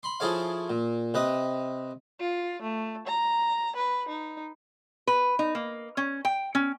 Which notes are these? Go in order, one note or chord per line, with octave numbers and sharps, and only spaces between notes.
B5 C6
F3 E4 G#4 A4 C#5 F5
A#2
C3 B4 D#5
F4
A3
A#5
B4
D#4
B4
D#4
A#3
C#4
G5
C#4